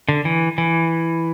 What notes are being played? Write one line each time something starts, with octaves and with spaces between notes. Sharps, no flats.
D3
E3
E3